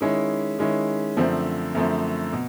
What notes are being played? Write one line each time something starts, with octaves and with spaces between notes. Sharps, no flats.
D#3 G#3 C#4 E4
D#3 G#3 C#4 E4
F#2 D3 F3 A3 C4
F#2 D3 F3 A3 C4
B2